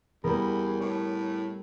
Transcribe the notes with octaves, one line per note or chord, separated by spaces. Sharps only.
E2 G3 B3 A#4
A2 C#5